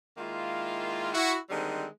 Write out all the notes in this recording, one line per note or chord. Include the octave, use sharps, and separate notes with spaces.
D#3 G#3 A#3 E4 F4
E4 F#4
D3 D#3 G3 G#3 C4